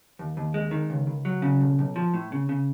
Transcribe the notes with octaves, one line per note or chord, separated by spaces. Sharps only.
D#2
D#2
G#3
D#3
C#2
C#2
F#3
C#3
B1
B1
F3
A2
C#3
C#3